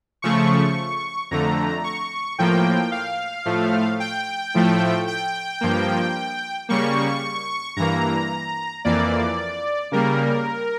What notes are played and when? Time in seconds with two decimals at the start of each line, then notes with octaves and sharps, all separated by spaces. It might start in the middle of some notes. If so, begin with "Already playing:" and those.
0.22 C#3 F3 A3 C#6
1.31 F2 D3 A3 A#5
1.84 C#6
2.39 A2 F3 A#3 G5
2.92 F5
3.45 A2 F3 A3
4.00 G5
4.54 A2 F3 A3
5.07 G5
5.61 G2 F3 A#3
6.69 C#3 G3 A#3 C#6
7.77 G2 E3 A#3 A#5
8.85 F2 E3 A#3 D5
9.92 C#3 G3 A#3 A#4